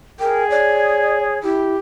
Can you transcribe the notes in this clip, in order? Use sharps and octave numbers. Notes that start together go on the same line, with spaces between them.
G#4 A#4 G5
C#5 D5
E4 G4